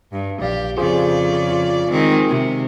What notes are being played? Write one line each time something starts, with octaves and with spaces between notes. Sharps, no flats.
G2
A#1 G4 D5 F5
F2 C#3 F4 G#4 C5 D5
F4
D#3 G#3 C4
C3